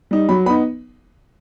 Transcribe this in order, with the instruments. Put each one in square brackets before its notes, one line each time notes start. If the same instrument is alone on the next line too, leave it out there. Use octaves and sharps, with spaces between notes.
[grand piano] G3 D#4
F#3 B5
B3 B5
D#4